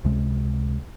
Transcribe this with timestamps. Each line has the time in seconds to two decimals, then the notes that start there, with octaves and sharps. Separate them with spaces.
0.04 C#2 C3 G#3